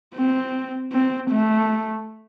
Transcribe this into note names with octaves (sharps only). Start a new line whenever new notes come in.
C4
C4
A3